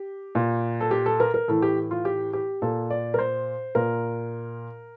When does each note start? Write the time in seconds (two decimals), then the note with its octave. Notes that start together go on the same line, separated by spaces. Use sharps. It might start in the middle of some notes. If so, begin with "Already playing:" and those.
Already playing: G4
0.35 A#2
0.81 A4
0.91 G4
1.06 A4
1.20 A#4
1.34 A#4
1.48 A2 E3 A4
1.62 G4
1.91 F4
2.05 G4
2.33 G4
2.62 A#2 A4
2.90 D5
3.14 A#4
3.19 C5
3.75 A#2 A#4